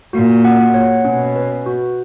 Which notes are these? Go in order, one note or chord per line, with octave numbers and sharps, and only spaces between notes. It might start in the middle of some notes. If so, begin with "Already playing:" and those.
A#2 F#4
F#5
C#5
B2 C#4
B4
F#4